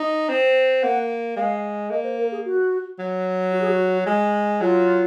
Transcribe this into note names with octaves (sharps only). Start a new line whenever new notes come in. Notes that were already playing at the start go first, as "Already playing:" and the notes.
Already playing: D#4
C4
A#3 F#5
G#3 F5
A#3 D#5
C5
A#4
G#4
F#4
F#3
F#4
G#4
F#4
G#3
F#3 F4